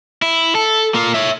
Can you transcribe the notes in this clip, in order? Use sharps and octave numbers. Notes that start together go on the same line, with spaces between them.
E4
A4
A#3 F4
C#5 E5